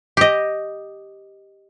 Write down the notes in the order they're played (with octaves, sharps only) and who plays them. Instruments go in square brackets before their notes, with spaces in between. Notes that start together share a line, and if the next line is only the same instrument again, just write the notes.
[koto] G4 D#5